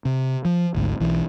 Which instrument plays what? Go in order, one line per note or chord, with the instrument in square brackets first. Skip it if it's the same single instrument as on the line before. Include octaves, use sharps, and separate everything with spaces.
[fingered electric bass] C3
F3
G#1 D2 G#2
B1 E3